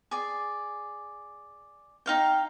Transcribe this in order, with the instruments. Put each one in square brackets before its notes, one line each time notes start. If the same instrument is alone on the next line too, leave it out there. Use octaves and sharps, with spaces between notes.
[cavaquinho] G#4 D5
D#4 F5 G5